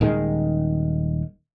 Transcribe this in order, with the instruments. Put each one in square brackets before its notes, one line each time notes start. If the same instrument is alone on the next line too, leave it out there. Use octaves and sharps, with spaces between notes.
[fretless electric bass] D#1 D#3 G#3